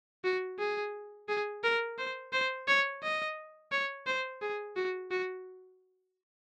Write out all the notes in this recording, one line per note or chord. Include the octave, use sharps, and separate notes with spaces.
F#4
G#4
G#4
A#4
C5
C5
C#5
D#5
C#5
C5
G#4
F#4
F#4